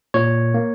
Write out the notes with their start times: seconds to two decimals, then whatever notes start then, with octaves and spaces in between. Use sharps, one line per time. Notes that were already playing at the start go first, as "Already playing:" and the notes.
0.14 A#2 C#5
0.54 A#3